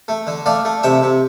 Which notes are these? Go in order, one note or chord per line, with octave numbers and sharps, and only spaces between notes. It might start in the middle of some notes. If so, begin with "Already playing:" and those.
A3
D3
A3 D5 F5
A3
C3 E5 G5
C3